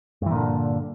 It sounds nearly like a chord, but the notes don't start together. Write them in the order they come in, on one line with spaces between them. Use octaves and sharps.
G2 E3 A#2 D3